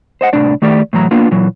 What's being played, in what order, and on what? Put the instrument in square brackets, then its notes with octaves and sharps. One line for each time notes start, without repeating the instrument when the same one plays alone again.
[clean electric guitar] C5 D#5 F#5
C2 A2 D4 D5
D#3 A3 G4 D5
A2 E3 F#3 A#5
A#3 B3 D4 F4
A#2 E3 F#3